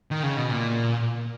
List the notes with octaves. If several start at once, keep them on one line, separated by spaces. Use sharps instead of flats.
D#3
C#3
B2
A#2